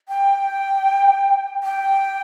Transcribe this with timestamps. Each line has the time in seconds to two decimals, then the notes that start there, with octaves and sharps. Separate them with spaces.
0.09 G5
1.63 G5